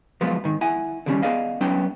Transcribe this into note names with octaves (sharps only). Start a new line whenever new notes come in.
F3 F#3 G#3 A#3 B3 F4
G#2 D#3
E4 F#5 G#5
D3 D#3 F#3 G3 C#4 D4
B3 G#4 D5 D#5 F5
F#3 B3 C#4 D4 G5